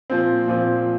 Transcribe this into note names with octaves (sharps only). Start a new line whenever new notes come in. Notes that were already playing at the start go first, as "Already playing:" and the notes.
A#2 F3 C4
A#2 F3 C4